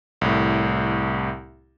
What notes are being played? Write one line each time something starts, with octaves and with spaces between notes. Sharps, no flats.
C2 A2